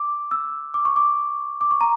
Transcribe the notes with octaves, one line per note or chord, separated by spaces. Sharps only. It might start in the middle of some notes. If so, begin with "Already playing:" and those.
Already playing: D6
E6
D6
C#6
D6
D6
C#6
A#5